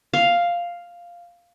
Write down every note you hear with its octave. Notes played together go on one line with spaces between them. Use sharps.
F5